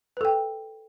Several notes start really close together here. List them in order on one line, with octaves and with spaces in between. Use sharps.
B4 A4 G5